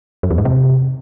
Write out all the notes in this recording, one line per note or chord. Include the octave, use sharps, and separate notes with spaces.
F#2
E2
G#2
C3